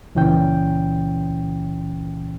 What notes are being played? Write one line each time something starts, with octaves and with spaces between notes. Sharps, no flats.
C#2 A#2 E3 C#4 G5